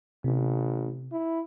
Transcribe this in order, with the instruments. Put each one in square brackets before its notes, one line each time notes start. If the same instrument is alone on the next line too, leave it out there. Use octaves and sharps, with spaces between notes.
[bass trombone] A1 [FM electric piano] C3
[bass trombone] E4